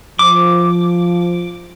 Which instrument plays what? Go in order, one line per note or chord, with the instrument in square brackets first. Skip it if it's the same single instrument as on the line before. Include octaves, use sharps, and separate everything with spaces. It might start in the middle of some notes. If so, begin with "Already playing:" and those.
[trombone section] F3 [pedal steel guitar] D6